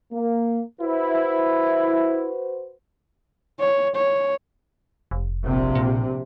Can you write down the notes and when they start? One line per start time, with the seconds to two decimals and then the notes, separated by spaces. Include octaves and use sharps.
0.11 A#3
0.81 E4 F#4 B4 C5
3.60 C#5
3.95 C#5
5.11 F1
5.46 A#1 C3
5.75 A#2